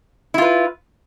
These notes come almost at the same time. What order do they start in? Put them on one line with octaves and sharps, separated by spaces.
E4 F4 B4